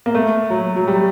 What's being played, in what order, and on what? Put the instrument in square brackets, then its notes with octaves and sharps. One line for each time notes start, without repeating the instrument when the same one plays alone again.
[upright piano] A#3
A3
F#3
F#3
G3